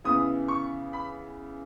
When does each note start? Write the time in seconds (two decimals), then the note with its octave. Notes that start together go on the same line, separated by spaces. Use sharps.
0.04 C#3 E3 B3 D#6
0.48 C#6
0.93 B5